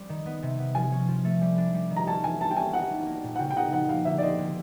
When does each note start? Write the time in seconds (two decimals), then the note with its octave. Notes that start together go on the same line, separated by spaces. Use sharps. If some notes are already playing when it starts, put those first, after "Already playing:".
Already playing: G3 C4
0.09 D#3
0.26 B3
0.43 C3
0.59 B3
0.75 F3 G#5
0.92 C#4
1.08 F3
1.25 A3
1.41 G3
1.58 D4
1.74 G3
1.91 D#3
1.96 A#5
2.07 C#4 A5
2.24 E3 G#5
2.41 A3 A5
2.51 G5
2.56 C#4 G#5
2.73 D#4 F#5
2.90 G3
3.06 A#3
3.24 A#2
3.36 F#5
3.39 C#3 G5
3.50 G5
3.56 D#4 F#5
3.73 F3 F#5
3.89 A#3 F5
4.05 D3 E5
4.18 D5
4.23 C4 D#5
4.38 D3